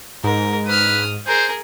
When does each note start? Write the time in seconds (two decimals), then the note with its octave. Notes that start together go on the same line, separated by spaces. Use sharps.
0.24 G#2 A#4
0.67 B4 D#6 F6
1.27 G#4 A#4 C5